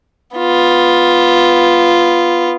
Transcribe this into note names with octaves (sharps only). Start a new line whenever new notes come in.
B3 F4